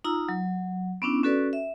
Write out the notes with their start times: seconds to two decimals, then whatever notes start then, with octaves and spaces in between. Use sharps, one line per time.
0.04 D#4 F4 A#5 E6
0.29 F#3
1.02 B3 C#4 D4 E4
1.24 C#4 F#4 A4 B4 D5
1.53 E5